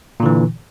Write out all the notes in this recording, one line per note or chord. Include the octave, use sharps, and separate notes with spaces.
A#2 D3 E3